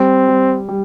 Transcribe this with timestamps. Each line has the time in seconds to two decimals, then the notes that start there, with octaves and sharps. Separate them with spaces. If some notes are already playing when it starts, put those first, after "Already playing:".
Already playing: G3 C4
0.28 G3
0.69 G3